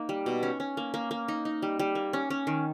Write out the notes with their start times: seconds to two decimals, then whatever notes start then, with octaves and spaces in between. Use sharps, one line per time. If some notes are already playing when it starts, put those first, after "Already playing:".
Already playing: A#3 D#4
0.09 G3
0.26 B2
0.43 C#4
0.60 C#4
0.77 A#3
0.94 A#3
1.11 A#3
1.28 D#4
1.45 D#4
1.62 G3
1.79 G3
1.95 A#3
2.13 C#4
2.30 C#4
2.47 D#3